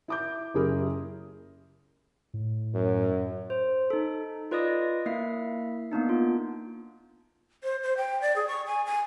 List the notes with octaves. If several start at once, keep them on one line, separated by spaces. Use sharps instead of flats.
E4 D6 G6
F#1 E4 G#4 A#4
A2
F#2
C5
D#4 A4
F4 B4 D5 D#5 D#6 A#6
A#3 E4 E5 C7
A#3 B3 D4 D#4
F4
C5
C5
G5
D5
G#4
C#6
G#5
G#5